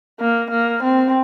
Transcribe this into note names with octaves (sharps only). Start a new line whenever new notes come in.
A#3
A#3
C4